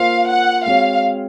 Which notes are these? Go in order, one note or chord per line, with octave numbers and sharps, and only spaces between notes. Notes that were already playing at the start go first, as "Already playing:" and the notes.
Already playing: A#3 F4 C5 F5
F#5
G#3 C4 F#4 C#5 F5